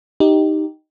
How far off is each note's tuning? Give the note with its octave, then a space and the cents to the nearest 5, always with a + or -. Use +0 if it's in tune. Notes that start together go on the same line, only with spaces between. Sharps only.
D#4 +0 G4 -5